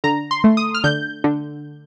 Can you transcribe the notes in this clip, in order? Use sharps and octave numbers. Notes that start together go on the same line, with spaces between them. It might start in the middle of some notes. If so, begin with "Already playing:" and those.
D3 A#5
C6
A3
D#6
F6
D3 G6
D3